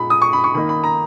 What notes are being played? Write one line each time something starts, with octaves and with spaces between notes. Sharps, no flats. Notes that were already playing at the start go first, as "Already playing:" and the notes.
Already playing: A#2 G#3 D#4 B5
D#6
C#6
B5
C#6
D#3 A#3 D#4 B5
B5
A#5